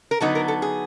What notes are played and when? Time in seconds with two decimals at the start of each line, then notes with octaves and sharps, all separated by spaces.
0.11 A#4
0.20 D3 F#3 B3 D#4 A4
0.35 A#4
0.48 A4
0.62 G#4